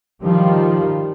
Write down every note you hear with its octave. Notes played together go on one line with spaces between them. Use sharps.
D#3 F3 G3